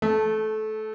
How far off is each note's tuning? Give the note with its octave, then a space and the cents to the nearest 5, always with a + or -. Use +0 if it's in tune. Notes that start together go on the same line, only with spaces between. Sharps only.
A3 -20 A5 +0